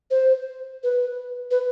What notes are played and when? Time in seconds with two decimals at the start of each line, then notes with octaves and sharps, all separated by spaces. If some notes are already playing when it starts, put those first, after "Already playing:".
0.11 C5
0.83 B4
1.51 B4